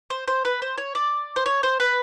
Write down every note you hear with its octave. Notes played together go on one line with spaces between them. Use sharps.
C5
C5
B4
C5
C#5
D5
C5
C#5
C5
B4